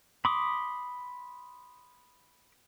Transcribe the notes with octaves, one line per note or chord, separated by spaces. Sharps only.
B5 C6 D6 D#6